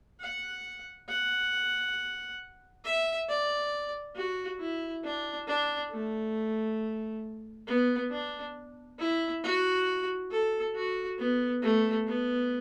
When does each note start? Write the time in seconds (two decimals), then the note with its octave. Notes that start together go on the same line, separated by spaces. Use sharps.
0.20 F#5
1.09 F#5
2.84 E5
3.29 D5
4.16 F#4
4.60 E4
5.04 D4
5.48 D4
5.91 A3
7.67 B3
8.11 D4
8.99 E4
9.43 F#4
10.31 A4
10.75 F#4
11.19 B3
11.62 A3
12.07 B3